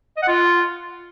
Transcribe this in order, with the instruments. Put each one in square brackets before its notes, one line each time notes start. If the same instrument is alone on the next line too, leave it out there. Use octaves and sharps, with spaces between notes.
[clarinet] D#5
F#5
F4